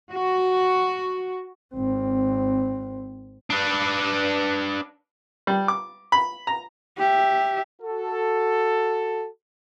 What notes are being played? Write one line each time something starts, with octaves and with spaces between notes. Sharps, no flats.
F#4
G#1 C4
D4 B4
G3
D6
B5
A#5
G4 E5
F#4 A4